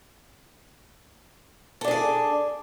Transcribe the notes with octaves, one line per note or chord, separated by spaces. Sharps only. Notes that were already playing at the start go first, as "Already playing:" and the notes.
D4 G#4 A4 D5